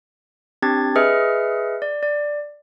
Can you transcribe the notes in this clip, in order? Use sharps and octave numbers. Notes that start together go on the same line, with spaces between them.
C4 D4 G4 G#6 A6
G#4 B4 D#5 E5 F6 C#7
D5
D5